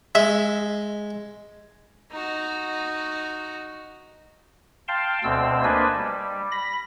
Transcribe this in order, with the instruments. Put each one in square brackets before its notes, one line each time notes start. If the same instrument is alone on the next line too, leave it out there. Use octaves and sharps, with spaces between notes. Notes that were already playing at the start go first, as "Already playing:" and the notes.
[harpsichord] G#3 [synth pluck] E5
[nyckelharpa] D#4 F#4
[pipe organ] F5 G5 A5 C6
D2 B2 C4 E6
A#3 D4 B4 C5 D#5 G#5
G3
B5 A#6